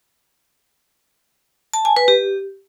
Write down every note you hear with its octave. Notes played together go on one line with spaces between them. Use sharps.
A5
G#5
B4
G4